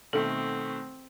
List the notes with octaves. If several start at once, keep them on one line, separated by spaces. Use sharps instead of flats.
B2 D#3 A3 C4 A4